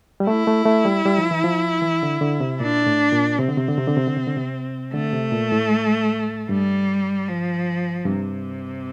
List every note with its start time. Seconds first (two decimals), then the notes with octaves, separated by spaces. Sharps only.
0.20 G3
0.27 A3 E4
0.47 A3
0.66 A3
0.85 G3
1.05 G3
1.18 F3
1.31 E3
1.44 F3
1.82 E3
2.03 D3
2.21 D3
2.40 C3
2.60 A#2 D4
2.86 A2
3.12 A#2
3.38 C3 C4
3.48 D3
3.57 C3
3.68 D3
3.78 C3
3.88 D3
3.97 C3
4.07 D3
4.17 C3
4.27 D3
4.36 C3
4.94 D3 A3
5.13 C3
5.32 A#2
5.52 A2
6.49 G2 G3
7.27 F3
8.05 G2 C3